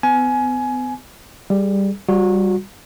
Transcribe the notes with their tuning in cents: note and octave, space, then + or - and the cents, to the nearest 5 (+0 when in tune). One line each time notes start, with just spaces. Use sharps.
B3 +40 G#5 +20
G3 +5 G#4 +20
G3 +0 F#4 -30